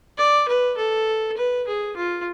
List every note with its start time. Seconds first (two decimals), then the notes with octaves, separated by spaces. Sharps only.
0.18 D5
0.48 B4
0.77 A4
1.37 B4
1.67 G#4
1.97 F4